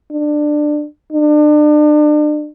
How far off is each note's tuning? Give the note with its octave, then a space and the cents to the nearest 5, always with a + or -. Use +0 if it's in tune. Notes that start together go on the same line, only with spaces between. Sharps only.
D4 +20
D4 +35